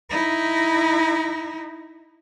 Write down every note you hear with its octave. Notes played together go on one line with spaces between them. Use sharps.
D#4 E4